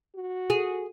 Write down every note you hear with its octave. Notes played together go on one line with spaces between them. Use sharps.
F#4
G#4